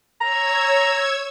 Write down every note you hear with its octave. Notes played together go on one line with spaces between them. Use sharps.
C#5 A#5 E6 G#6